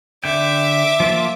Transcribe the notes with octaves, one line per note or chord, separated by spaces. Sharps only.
D3 E5 G5 D6
F3 A#3 F4